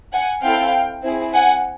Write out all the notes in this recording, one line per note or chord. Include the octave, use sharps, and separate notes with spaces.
F#5 G#5
C4 E4 A4 F5 G5
C4 E4 G#4
F#5 G#5